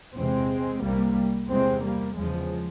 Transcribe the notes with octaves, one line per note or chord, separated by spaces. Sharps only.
E2 C3 G#3 C4
C2 C3 G3 A#3
E2 C3 G#3 C4
G3 A#3
E2 C#3 F3 G#3